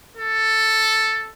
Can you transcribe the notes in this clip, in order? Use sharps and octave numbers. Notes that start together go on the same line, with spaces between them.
A4